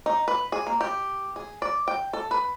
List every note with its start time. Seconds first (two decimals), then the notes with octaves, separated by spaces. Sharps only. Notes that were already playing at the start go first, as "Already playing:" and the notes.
0.06 D#4
0.28 B4
0.52 G#4
0.67 A#3
0.81 G4
1.36 G#4
1.62 D5
1.88 G5
2.13 A4
2.31 B4